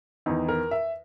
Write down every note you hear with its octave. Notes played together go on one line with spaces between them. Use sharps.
E2 D#3 D#4
A#4
E5